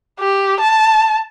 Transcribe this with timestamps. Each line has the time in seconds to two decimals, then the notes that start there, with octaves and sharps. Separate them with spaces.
0.20 G4
0.60 A5